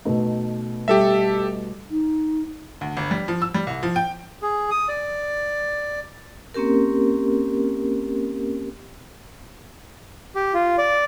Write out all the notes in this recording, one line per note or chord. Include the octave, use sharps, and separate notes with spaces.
B2 A3 D#4
G3 G4 A4 E5
D#4
D2
G1
G3
F3
E6
G3
C2
F3
G5
G#4
D#6
D5
A#3 C4 C#4 G4 A#4
G4
F4
D5